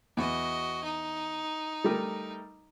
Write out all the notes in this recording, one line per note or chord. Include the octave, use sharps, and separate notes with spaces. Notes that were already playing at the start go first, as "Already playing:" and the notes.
E2 F#4 D#5
D#4
G3 A3 A#4